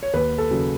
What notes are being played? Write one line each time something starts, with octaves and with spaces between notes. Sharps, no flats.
C#5
D#2 B4
A4
C#3 F#3